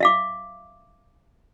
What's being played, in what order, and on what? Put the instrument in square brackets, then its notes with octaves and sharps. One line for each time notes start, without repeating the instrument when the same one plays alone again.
[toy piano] E5 F5 D6